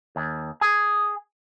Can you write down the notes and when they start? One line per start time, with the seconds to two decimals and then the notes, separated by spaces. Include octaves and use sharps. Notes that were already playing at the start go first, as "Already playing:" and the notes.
0.16 D#2
0.61 G#4